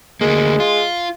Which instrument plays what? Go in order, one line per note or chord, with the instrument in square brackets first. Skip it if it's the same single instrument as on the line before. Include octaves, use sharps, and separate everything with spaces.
[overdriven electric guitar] D2 A#3 [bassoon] G#3
[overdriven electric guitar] F4